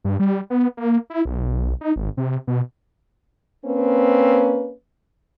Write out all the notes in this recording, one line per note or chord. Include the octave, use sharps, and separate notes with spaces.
G2
G3
B3
A#3
E4
B1
D#4
G#1
C3
B2
A#3 C4 C#4 B4